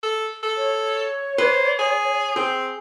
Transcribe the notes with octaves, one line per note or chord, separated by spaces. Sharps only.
A4
A4
C#5
B4 C5
G#4
C4 G#4